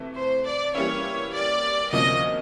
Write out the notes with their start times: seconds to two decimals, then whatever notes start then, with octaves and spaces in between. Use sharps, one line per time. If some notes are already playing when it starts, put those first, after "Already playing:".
Already playing: C3 E3 A3
0.16 C5
0.45 D5
0.75 E3 G3 A#3 C#4 E4 C#5
1.33 D5
1.92 D2 C3 F3 A#3 C#4 D#5